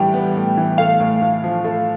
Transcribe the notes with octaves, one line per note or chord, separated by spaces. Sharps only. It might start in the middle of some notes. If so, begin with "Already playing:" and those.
Already playing: A2 E3 G3 G5
B3
A2
E3
A3 F5
A2
A2
F3
A3